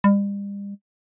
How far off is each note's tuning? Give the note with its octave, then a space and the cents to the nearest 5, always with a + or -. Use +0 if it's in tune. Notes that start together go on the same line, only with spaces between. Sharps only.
G3 +40